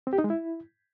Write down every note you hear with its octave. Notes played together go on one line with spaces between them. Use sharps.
C4
G4
D#4
G#3
E4